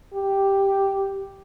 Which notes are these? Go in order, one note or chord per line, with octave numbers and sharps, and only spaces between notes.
G4